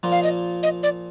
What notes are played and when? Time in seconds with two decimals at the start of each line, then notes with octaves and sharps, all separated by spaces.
0.03 A#2 F3 A#3 F4
0.12 F5
0.23 D#5
0.63 D#5
0.83 D5